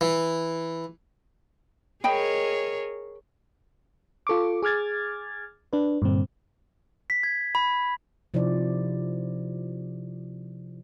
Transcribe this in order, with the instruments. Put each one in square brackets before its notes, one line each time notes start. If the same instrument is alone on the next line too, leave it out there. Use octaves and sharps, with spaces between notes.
[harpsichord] E3
[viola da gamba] G#4 A#4 C#5 [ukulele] D#5 G5 B5
[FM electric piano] F4 A4 C#6 D6
G#4 D6 F6 G#6 A6
D4 B4
G2 A#2 D3 C4
[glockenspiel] B6
G#6
B5
[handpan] C3 F3 D#4 E4 C5 D5